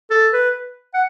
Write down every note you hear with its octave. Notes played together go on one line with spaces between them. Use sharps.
A4
B4
F#5